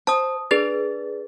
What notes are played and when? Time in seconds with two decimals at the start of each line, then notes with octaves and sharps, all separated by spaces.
0.07 C5 A5 D#6
0.51 D4 G#4 B4 A6